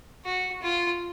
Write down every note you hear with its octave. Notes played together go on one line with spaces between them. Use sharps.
F#4
F4